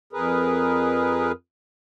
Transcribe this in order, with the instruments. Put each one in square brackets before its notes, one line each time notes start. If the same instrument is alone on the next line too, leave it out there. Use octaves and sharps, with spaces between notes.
[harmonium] F2 G#4 A#4 B4